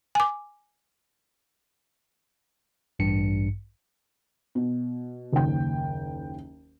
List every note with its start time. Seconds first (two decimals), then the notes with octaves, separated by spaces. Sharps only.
0.15 G#5 D6
2.99 A1 G2 C#7
4.55 B2
5.32 F#1 D#2 G5